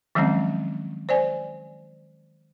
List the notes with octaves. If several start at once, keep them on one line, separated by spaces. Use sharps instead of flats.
D#3 F3 F#3 G#3 C4 C#4
C5 D5 G#5